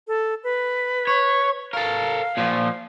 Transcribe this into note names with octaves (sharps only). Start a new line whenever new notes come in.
A4
B4
C#5
A4 A#4 F5
A#2 F3